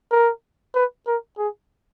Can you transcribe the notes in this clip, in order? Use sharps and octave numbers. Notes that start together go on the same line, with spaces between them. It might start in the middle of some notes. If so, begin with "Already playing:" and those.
A#4
B4
A#4
G#4